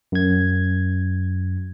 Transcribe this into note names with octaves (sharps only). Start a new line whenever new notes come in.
F#2 G#6